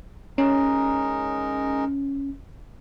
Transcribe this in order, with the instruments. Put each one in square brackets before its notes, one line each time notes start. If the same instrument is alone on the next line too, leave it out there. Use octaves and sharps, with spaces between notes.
[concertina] G#3 D#4 A#4 [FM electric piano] C#4